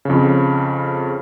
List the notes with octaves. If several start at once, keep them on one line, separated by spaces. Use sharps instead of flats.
F2 C#3